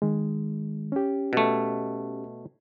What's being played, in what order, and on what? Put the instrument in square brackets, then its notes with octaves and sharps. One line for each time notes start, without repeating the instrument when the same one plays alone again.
[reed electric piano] D#3 G#3
C#4 G4
[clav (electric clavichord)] B2 A3